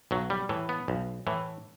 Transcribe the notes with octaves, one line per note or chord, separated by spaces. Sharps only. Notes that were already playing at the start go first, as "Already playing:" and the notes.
B1 F#3
G3
A2 E3
B3
B1
A2 E3